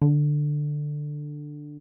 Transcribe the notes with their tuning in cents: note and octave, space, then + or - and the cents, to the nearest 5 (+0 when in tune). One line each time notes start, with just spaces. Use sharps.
D3 +10